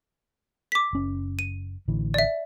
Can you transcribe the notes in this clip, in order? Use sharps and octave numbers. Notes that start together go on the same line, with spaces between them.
D6 B6
F#1 C#4
D#7
A1 D3 E3
D5 E5